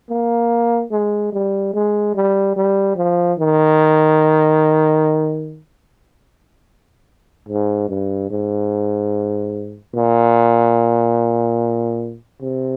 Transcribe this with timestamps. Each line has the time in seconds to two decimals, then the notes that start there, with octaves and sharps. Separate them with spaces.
0.10 A#3
0.92 G#3
1.33 G3
1.74 G#3
2.15 G3
2.56 G3
2.96 F3
3.39 D#3
7.49 G#2
7.89 G2
8.31 G#2
9.95 A#2
12.42 C3